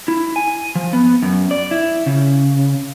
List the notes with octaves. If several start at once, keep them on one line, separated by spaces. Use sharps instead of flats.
E4
G#5
F3
B3
F#2
D5
E4
C#3